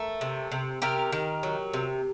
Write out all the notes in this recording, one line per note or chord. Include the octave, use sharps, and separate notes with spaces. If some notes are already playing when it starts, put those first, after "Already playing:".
Already playing: A3 A#4
C3
C3
C3 G4 A#4
D#3
F#3
C3